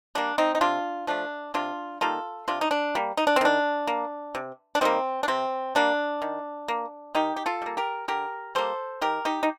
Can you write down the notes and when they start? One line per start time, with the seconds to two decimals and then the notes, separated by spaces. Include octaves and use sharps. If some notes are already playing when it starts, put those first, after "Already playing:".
0.15 G3 A#3 D4
0.38 C4 D#4
0.55 D#4
0.61 C3 D4 F4
1.07 F3 A3 D4
1.54 C3 D4 F4
2.01 D#3 G3 A#3 F4 A4
2.48 C3 D4 F4
2.61 D#4
2.71 D4
2.95 G3 A#3
3.17 D#4
3.27 D4
3.36 C4
3.41 D#3 D4
3.87 A#3
4.35 C3
4.75 D4
4.81 D#3 G3 A#3 C4
5.23 D4
5.28 C3 C4
5.75 G3 A#3 D4
6.22 D#3
6.68 A#3
7.15 D#3 D#4 G4
7.36 G4
7.46 F4 A4
7.62 G3 A#3
7.77 G4 A#4
8.08 D3 G4 A#4
8.55 G3 A#3 A4 C5
9.01 D#3 G4 A#4
9.25 D#4 G4
9.43 D#4